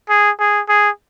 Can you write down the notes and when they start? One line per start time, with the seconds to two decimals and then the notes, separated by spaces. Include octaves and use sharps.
0.09 G#4
0.40 G#4
0.69 G#4